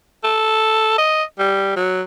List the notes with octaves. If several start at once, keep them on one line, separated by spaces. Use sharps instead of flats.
A4
D#5
G3
F#3